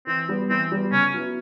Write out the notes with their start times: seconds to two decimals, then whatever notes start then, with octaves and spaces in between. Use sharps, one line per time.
0.07 E3 C4
0.29 G3 B3
0.50 E3 C4
0.72 G3 B3
0.92 C#3 C#4
1.14 F#3 B3 E4